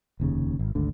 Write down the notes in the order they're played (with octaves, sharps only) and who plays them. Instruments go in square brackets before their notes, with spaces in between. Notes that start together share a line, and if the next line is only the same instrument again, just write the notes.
[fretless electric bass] F1 D#2 C#3
G#1
G#1 D2 D3